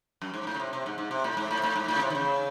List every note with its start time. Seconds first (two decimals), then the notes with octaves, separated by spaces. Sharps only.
0.22 F#2
0.34 G#2
0.47 A2
0.54 C#3
0.60 C3
0.73 C3
0.86 G#2
0.98 G#2
1.11 C3
1.24 A2
1.37 G#2
1.51 A2
1.58 C3
1.63 A2
1.76 G#2
1.88 A2
1.95 C#3
2.01 C3
2.10 D#3
2.15 C#3